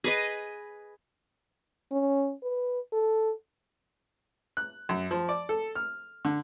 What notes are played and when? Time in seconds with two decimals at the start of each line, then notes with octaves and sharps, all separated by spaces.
0.04 G#4 B4 D#5
1.92 C#4
2.43 B4
2.92 A4
4.57 F#6
4.89 F#2
5.11 F3
5.29 D5
5.49 A4
5.75 F6
6.25 D3